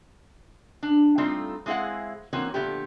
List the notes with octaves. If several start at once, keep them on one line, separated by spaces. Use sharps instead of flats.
D4
G3 A3 C4 D#4 F4
G#3 C4 E4 G#4 F5 F#5
E3 A#3 C4 C#4 F#4
A#2 D3 F3 A3 B3 G4